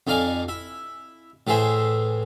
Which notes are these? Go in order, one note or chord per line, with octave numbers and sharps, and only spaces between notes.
F2 D#4 D5 F5 G#5
E4
A2 E3 G#4 C5 E5